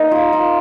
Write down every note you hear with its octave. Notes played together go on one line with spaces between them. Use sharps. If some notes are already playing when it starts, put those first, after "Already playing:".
Already playing: A#3 D#4 B5
F4
F4